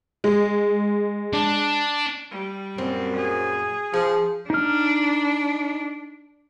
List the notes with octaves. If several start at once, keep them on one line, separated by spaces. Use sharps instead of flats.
G#3
D4
G3
F#2 A#2 C4
G#4
F3 G#4
D4 D#4 F6